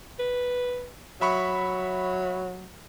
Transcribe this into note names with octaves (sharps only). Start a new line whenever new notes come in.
B4
F#3 E5 B5 C#6